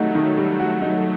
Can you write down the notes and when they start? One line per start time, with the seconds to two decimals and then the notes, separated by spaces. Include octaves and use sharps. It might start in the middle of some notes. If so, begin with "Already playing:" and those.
Already playing: D#3 F#3 G3 A3 D#4 F#4
0.15 D#3 F#3
0.37 G3
0.60 F#4
0.82 D#4